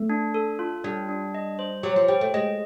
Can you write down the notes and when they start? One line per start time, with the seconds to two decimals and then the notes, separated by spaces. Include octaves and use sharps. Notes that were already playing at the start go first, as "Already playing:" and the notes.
Already playing: A3
0.09 D4
0.34 A4
0.59 F4
0.84 G3 D4
1.09 D4
1.35 D#5
1.59 C5
1.83 F#3 G4
1.96 F3
2.08 G3 G5
2.21 A3
2.34 G#3 D#5